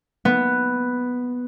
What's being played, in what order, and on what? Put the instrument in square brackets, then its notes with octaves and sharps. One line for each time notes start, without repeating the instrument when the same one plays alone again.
[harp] B3